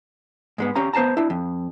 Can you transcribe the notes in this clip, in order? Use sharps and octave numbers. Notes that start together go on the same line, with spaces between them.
G#2 G#3 B3
C#4 G4 F5 A#5
B3 C5 F5 A5 A#5
D4 E4
F2